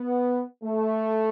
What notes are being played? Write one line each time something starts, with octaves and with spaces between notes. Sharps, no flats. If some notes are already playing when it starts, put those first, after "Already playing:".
Already playing: B3
A3